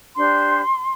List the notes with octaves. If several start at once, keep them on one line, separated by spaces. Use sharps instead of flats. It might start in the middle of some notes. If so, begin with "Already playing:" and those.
D4 G4 C5 C6